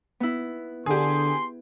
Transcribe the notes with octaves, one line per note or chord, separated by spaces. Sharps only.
B3 E4
D3 G4 G#4 C6